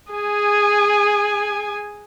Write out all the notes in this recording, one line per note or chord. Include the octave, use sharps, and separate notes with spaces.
G#4 G#5